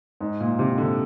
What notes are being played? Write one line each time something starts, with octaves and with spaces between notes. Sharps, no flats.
G#2
A#2
C3
D3